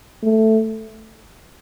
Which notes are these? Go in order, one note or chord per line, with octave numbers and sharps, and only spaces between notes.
A3